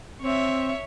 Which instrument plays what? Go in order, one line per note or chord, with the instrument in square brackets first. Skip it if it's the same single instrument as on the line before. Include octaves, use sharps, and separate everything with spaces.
[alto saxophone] C4 [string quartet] C#5 E5